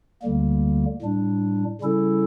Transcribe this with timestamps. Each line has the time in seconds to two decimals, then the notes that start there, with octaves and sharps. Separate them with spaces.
0.22 D2 D3 G3 A#3
1.02 A2 G3 D4
1.81 C#3 G3 C#4 E4 A4